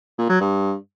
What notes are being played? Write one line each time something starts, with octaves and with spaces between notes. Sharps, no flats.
A#2
F#3
G2